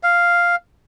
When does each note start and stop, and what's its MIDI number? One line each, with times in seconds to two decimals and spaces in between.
0.03 0.56 77